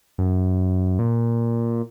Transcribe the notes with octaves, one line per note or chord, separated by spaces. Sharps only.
F#2
A#2